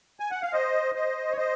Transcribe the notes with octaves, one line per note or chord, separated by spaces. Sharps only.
G#5
F#5
F5
C5 D#5
C5 D#5
C#5
C5 D#5